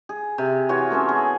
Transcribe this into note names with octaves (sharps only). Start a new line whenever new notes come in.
G#4
C3 G#5
E3 F4 F#4 C#5
A3 B3 C#4 E5
G#4